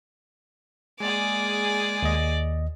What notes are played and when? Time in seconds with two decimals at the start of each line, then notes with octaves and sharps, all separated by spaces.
1.00 G#3 A#3 G#4 D5
2.02 D#2 D#5